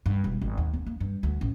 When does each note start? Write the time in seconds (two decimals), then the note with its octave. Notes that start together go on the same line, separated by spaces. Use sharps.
0.06 G2
0.24 E1
0.41 G#1
0.58 D#2
0.74 B3
0.86 A#3
1.00 G2
1.23 D2
1.41 A1